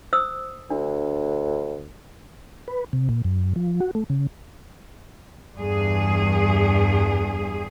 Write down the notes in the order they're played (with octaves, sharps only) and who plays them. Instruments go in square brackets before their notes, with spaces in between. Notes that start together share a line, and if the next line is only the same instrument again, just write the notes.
[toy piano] C5 D#6 E6
[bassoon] D2 [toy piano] D4
[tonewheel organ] B4
C3
A#2
F#2
F3
F#4
A3
C#3
[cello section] E2 G2 G#4